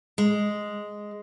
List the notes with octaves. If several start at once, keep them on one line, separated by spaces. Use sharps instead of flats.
G#3